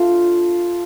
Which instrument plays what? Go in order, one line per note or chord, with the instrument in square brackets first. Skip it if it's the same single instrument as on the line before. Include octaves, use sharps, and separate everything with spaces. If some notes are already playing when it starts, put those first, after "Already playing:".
Already playing: [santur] A3 D4 F4 F5